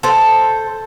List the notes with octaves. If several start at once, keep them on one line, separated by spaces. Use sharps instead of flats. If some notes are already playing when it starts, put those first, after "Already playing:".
A4 C5